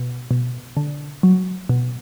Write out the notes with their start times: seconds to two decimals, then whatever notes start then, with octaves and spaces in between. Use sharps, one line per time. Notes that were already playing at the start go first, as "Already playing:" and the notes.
Already playing: B2
0.31 B2
0.77 D3
1.23 F#3
1.69 B2